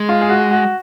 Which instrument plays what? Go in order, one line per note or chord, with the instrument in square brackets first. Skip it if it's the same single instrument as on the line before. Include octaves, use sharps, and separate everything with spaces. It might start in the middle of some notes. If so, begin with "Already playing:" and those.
Already playing: [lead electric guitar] G#3
[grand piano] F4
G#4
F#4
F#4